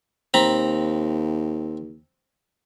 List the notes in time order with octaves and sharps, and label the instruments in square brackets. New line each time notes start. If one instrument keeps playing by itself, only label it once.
[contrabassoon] D#2 [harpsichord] C4 A#5 B5